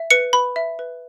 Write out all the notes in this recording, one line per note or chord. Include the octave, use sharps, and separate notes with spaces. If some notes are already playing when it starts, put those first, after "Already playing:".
Already playing: E5
B4 C#7
B4 B5
E5
B4